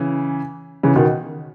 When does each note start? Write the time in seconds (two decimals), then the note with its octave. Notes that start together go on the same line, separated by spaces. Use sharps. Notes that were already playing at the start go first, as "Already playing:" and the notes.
Already playing: C#3 E3
0.83 C#3 E3
0.96 B2 D#3